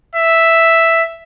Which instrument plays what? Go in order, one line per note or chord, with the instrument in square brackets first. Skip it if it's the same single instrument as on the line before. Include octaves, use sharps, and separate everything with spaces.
[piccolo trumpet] E5